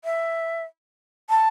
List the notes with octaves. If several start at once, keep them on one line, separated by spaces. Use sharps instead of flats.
E5
A5